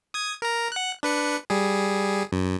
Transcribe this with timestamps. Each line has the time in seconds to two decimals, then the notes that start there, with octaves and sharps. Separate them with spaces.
0.14 D#6 G#6
0.42 A#4 A#5
0.72 F#5 F#6
1.03 D4 B4 C#7
1.50 G3 G#4
2.32 F#2